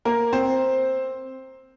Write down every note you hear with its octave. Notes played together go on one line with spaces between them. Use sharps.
A#3 A#4
C4 C5